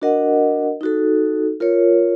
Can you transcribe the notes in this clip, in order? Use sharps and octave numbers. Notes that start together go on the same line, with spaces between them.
D4 F#4 A#4 D#5 F#5
D#4 F#4 A4
F4 A#4 C#5